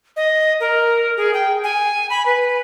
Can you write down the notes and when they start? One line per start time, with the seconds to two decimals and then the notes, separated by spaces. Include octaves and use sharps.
0.16 D#5
0.60 A#4
1.17 G#4
1.34 G5
1.64 G#5
2.10 B5
2.26 B4